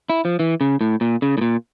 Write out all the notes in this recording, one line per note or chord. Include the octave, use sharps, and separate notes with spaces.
E4
F3
E3
C#3
A2
A#2
C#3
A2
A#2